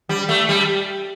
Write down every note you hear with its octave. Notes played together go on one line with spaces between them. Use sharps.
G3
A3
G3